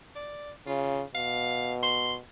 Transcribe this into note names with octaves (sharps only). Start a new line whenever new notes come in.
D5
C#3 F4
B2 F5
C6